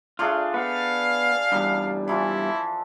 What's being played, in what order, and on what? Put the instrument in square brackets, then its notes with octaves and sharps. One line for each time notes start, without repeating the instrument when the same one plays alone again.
[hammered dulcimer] A3 D4 G#4 [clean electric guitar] F4
[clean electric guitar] B3 [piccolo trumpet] F5
[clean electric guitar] E2 G2 [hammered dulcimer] G3
[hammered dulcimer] E3 F3 [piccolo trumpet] E4